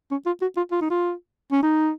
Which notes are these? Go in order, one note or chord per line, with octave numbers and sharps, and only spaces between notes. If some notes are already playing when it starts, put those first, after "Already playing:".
C#4
F4
F#4
F4
F4
D#4
F4
C#4
D#4